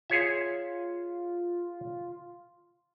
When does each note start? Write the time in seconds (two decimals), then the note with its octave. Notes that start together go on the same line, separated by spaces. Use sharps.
0.10 F4 G#4 C#5 E5